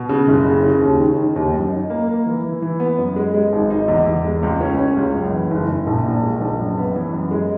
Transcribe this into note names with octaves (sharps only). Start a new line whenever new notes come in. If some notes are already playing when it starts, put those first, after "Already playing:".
Already playing: B2
C#3
F#1
C#3
C#3
D#2
D#3
D#3
D#2
F#2
D#4
A#3
A#3
E3
E3
E3
B3
F#2
G#3
G#3
G#1
D#4
E2
E2
G#3
C#2
C#4
C#4
C#2
F#2
E3
F#1
F#1
A#1
A#2
G#3
A#1
F#2
B3
E3
F#2
G#3